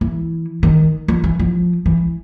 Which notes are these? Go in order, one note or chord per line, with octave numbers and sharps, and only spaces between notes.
E3
D#3
F3
E3
F3
E3